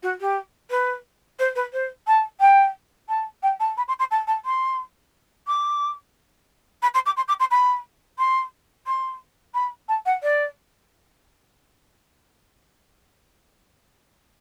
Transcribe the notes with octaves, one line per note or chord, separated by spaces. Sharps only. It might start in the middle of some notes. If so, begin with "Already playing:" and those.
F#4
G4
B4
C5
B4
C5
A5
G5
A5
G5
A5
B5
C6
C6
A5
A5
C6
D6
B5
C6
D6
C6
D6
C6
B5
C6
C6
B5
A5
F#5
D5